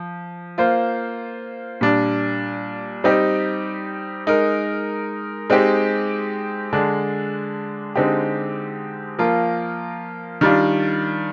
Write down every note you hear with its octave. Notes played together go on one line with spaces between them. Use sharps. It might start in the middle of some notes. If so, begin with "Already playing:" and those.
Already playing: F3
A#3 F4 C5
A#2 G3 D4
G3 C4 D#4 G4
G#3 D#4 A#4
G#3 C4 D#4 G4
D3 G#3 D4
D3 G#3 C4 D#4 G4
F3 A#3 F4 A#4
D#3 G3 D4 F4